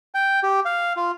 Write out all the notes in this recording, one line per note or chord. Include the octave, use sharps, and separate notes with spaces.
G5
G4
F5
F4